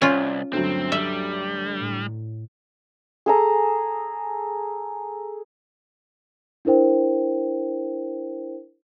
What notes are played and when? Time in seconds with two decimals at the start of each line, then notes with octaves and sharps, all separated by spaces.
0.02 C2 C#4 F4
0.53 D2 G2 F#3 C4
0.92 G3 E5
1.80 A2
3.26 G#4 A4 A#5
6.65 D4 E4 A#4 C5 G5